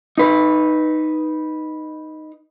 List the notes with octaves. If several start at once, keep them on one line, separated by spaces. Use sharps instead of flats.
D#4 B4